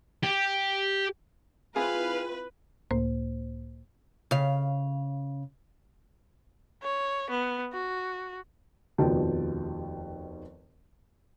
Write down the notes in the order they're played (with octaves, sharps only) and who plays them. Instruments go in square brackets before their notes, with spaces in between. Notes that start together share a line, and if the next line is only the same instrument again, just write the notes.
[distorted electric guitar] G4
[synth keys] C4 E4 F4 [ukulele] G#4 [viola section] B4 [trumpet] F5
[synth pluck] C#2 A2 A#3 C5
[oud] C#3 F5
[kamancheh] C#5
B3
F#4
[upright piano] F1 D#2 B2 F3 G5 A5